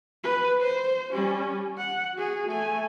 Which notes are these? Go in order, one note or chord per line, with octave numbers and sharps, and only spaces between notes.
B4
C5
G3 C#4
F#5
F#4 G#4
A3 G#5